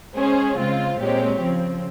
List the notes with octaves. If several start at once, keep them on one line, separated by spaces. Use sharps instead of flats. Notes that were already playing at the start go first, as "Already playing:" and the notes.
G#3 C#4 G#4 C5
C#3 G#3 C4 F4
A#2 G#3 C4 G4 C#5
C#3 F3 C4